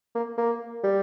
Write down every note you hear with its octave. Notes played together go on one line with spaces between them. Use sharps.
A#3
A#3
G3